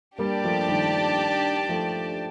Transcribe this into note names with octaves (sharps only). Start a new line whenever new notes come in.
G3 A#3 D4 G4 D5 A5
F3 A3
D#3 G3
F3 A3